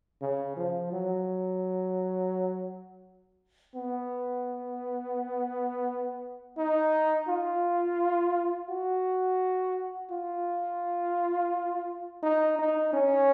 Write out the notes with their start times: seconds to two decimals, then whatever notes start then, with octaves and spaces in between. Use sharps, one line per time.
0.22 C#3
0.57 F3
0.92 F#3
3.75 B3
6.58 D#4
7.28 F4
8.70 F#4
10.11 F4
12.23 D#4
12.59 D#4
12.93 C#4